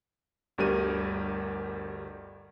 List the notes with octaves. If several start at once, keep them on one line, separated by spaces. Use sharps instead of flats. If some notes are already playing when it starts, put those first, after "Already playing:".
G1 D2 G3 A#4 D#7